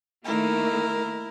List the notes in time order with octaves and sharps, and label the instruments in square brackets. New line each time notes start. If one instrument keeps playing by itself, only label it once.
[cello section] D#3 A3 A#3 [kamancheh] E4 A#4